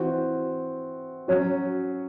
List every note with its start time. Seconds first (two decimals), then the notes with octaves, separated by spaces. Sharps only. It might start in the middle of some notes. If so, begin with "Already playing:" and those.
Already playing: E3 C4 F#4
1.28 F#3 C#4 F#4